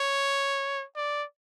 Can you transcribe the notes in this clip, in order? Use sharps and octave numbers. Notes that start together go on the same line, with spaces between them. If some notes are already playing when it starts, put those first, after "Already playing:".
Already playing: C#5
D5